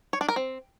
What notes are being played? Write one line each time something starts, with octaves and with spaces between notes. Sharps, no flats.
C#5
D4
A#4
C4